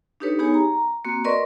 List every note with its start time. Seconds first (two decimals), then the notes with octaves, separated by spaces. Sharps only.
0.20 D4 D#4 G4 A4 B4 C#5
0.39 B3 D#4 G4 G#4 C#5 G#5
0.54 A#5
1.05 A#3 C4 F#4
1.24 A#4 B4 D5 D#5 C6 C#6